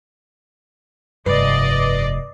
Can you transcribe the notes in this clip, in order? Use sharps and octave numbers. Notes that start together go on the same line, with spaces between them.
F1 G2 B4 D5 D#5 C7